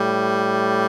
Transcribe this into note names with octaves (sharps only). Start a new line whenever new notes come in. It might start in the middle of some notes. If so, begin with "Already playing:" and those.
Already playing: A2 G3